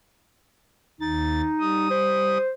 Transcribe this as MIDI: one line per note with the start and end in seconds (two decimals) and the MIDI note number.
1.01 1.41 39
1.01 1.89 63
1.01 1.41 93
1.60 2.38 55
1.60 2.38 87
1.91 2.51 72